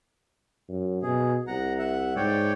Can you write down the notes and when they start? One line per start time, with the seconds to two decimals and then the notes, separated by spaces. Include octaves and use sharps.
0.69 F#2
1.03 B2 G#4
1.47 C2 F#5 A#5
1.79 E5 F#5
2.16 G#2 C#5 D5 G5